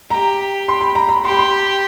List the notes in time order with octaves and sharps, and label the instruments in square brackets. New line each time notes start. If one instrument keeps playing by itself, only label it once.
[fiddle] G4 [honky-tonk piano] A#5
[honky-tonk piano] C6
B5
A#5
B5
[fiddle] G4 [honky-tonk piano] C6
[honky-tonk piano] B5
C6